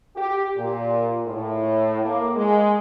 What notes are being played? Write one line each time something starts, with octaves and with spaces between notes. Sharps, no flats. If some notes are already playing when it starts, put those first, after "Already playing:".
G4
A#2
A2
A#3
G#3